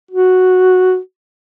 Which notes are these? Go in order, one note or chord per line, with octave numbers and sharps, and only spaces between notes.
F#4